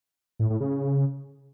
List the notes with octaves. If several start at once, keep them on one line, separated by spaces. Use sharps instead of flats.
A2
A2
C#3